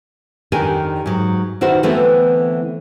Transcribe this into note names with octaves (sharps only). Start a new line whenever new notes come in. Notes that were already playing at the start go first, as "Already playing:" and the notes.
F2 D#3 D4 G4 A#4 G#5
G#2 F#3
D#3 E4 F#4 C5
D3 E3 A3 B3 C4